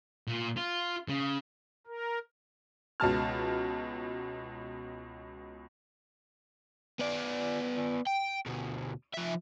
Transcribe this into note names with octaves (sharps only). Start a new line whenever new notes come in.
A#2
F4
C#3
A#4
C#2 B2 A5 F6
B3 D5
G5
D2 B2
F3 E5